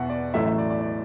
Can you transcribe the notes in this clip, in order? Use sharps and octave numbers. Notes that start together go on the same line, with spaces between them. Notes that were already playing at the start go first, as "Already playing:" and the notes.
Already playing: E2 B2 E5 F#5
D5
A1 A2 F#3 A3 E5
E5
D5
D5
D5